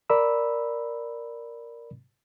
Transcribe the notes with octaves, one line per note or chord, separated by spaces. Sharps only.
A#4 D5 B5 E6